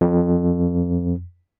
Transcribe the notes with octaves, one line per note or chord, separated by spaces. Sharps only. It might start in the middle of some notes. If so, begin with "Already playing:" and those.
F2